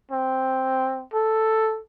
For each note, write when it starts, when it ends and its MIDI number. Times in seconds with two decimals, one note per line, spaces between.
0.11 1.05 60
1.14 1.80 69